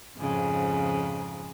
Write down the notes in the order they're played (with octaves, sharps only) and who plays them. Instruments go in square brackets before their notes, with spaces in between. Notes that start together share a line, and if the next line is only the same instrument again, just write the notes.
[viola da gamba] F2 G#2 C#3